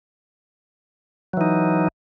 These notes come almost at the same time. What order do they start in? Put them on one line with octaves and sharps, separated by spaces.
F#3 E3 D#4